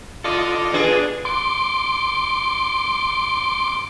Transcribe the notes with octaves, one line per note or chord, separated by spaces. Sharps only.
F4 A4 D5 D#5
B3 D4 G#4
C6 D6